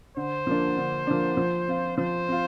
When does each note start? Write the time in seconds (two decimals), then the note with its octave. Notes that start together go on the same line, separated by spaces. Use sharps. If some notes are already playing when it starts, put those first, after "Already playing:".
0.17 D3 C5
0.47 F3 A#3 D4
0.78 D3
1.07 F3 A#3 D4
1.37 F3
1.68 C4 F4
1.97 F3 C5
2.28 C4 F4